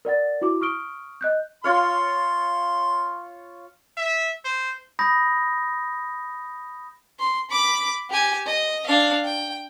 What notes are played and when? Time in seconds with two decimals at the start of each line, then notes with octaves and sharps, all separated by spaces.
0.05 A#4 D5 F#5 A6
0.41 E4 F#4 D6
0.61 C#6 D#6 F6 D7 G7
1.21 D#5 F#6 G6
1.64 F4 C#5 F5 C6
3.97 E5
4.45 C5
4.99 B5 D#6 G6 A#6
7.19 C6
7.50 B5 D6
8.09 G4 G#5
8.46 D#5
8.87 D4 F5
9.24 G5